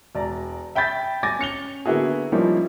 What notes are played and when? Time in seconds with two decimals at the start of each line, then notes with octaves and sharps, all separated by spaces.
0.15 E1 D5 A#5
0.75 E5 G5 B5 G6 A6 B6
1.23 G#5 D6 A6 A#6
1.39 C#4 C#7 F7 G7
1.86 D3 A#3 B3 E4 F#4 G#4
2.32 F3 G3 A#3 C#4 D#4 E4